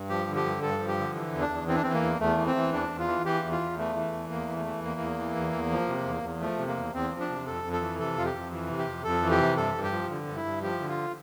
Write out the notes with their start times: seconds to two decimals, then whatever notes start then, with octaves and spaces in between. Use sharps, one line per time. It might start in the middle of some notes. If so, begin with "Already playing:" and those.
Already playing: G2
0.09 F3 G4
0.27 D3
0.36 G4
0.45 G2
0.62 G2 A4
0.79 F3
0.88 G4
0.98 D3
1.15 E3
1.32 E2
1.40 D4
1.49 E2
1.68 E3 C4
1.75 D4
1.83 E3 C4
1.94 A#3
2.02 E2
2.20 E2 A3
2.37 E3
2.47 C4
2.56 E3
2.72 E2 D4
2.90 E2
2.99 F4
3.08 E3
3.25 E3 G4
3.43 E2
3.51 F4
3.60 E2
3.78 E3 A3
3.96 E3
4.13 E2
4.30 E2 A#3
4.48 E3
4.56 A3
4.65 E3
4.83 E2 A#3
5.00 E2
5.18 E3
5.36 E2
5.54 E2
5.71 F3
5.88 C3
6.06 E2
6.23 E2
6.41 F3 A3
6.59 C3
6.68 A#3
6.76 E2
6.94 E2 C4
7.11 F3
7.20 D4
7.29 C3
7.46 F2 A4
7.64 F2
7.73 A4
7.81 E3
7.99 C3 A4
8.17 F2 F4
8.25 G4
8.35 F2
8.52 E3
8.69 C3
8.78 G4
8.87 F2
9.04 F2 A4
9.21 E3
9.31 G4
9.39 C3
9.57 G2 A4
9.74 G2
9.84 G4
9.92 F3
10.10 D3
10.27 G2
10.36 E4
10.45 G2
10.62 F3 G4
10.80 D3
10.89 F4